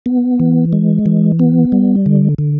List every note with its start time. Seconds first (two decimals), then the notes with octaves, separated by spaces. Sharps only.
0.06 B3
0.40 E3
0.73 G#3
1.06 E3
1.39 B3
1.72 G3
2.06 D3
2.38 D3